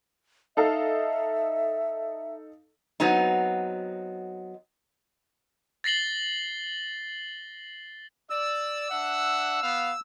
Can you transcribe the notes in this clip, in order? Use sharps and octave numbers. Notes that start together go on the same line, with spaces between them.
D#4 A4 E5 F5
F#3 B3 C4 D#4
A6 A#6 C7 F#7 G7
D5 E6
D4 E5 F#5
B3 F5